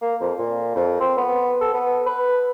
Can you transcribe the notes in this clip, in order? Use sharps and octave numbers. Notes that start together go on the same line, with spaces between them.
A#3
F2
A#2
F2
C4
B3
A4
B3
B4